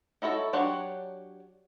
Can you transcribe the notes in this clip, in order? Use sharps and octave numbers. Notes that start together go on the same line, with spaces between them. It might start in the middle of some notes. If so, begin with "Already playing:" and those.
D#4 E4 F#4 A4 C#5
F#3 D4 G4 C#5 F#5